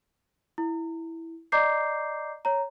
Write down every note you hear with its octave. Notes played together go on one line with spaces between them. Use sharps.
E4
D5 D#5 A#5 D6 G6 C7
C#5 A#5